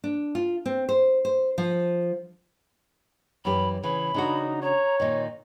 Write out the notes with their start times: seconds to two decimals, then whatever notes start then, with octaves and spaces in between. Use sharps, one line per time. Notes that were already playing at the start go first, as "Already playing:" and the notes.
0.04 D4
0.35 F4
0.66 C4
0.89 C5
1.25 C5
1.58 F3
3.45 F#2 E3 G4 B5
3.83 C#3 E3 B5
4.14 C#3 D4 D#4 F#4
4.62 C#5 A#5
5.00 A#2 D#3 D#5